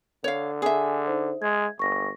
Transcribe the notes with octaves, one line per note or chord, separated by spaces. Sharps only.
D3 C#5 F5
G#4 E5 G#5
D#4 C5
G#3 G#6
G1 C#6 A#6